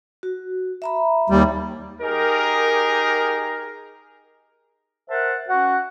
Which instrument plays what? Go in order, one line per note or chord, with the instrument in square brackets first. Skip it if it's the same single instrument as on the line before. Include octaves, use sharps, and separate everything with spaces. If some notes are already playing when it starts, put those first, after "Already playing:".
[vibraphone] F#4
E5 A#5 B5
[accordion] D#2 G3
[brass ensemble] D#4 G4 G#4 A#4
[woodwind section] A#4 C5 E5 F#5 A5
C#4 F#4 F#5